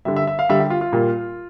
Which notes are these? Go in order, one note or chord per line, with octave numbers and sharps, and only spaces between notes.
D3 G3 E5
E5
E5
F5
D3 G3 E5
G4
F4
F4
A#2 G3